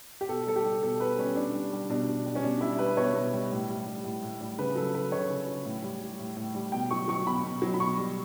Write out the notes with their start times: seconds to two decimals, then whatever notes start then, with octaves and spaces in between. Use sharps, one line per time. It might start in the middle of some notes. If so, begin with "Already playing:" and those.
0.21 G4
0.29 B2 A4
0.46 G3 A4
0.56 G4
0.64 G3
0.83 B2 A4
1.00 B2 B4
1.18 G3 C#4
1.36 B2 D4
1.54 G3
1.72 G3
1.90 B2 D4
2.08 B2
2.26 G3
2.35 C#4
2.43 B2 D4
2.61 G3 E4
2.79 G3 B4
2.97 B2 C#5
3.14 B2
3.33 G3
3.51 A2
3.69 G3
3.86 G3
4.04 A2
4.23 A2
4.41 G3
4.58 C#3 B4
4.75 F#3 A4
4.94 F#3 B4
5.12 C#3 C#5
5.30 C#3
5.47 F#3
5.65 A2
5.83 G3
6.02 G3
6.19 A2
6.37 A2
6.55 G3
6.72 B2 G5
6.91 F#3 C#6
7.08 F#3 C#6
7.26 B2 B5
7.44 B2
7.62 F#3
7.74 B5
7.80 B2 C#6
7.98 G3